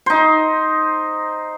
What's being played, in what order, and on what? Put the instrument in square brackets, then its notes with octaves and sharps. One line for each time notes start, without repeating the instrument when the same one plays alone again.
[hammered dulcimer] D#4 C5